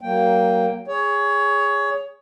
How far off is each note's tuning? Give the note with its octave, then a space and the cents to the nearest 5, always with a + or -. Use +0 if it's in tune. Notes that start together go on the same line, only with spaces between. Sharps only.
F#3 +25 A#3 +0 G5 +0
G#4 -10 C#5 +20